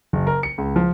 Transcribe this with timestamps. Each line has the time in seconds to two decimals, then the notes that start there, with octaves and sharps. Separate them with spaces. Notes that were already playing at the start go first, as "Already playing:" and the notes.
0.13 F#1
0.27 A#4
0.43 C#7
0.58 C#2
0.76 F3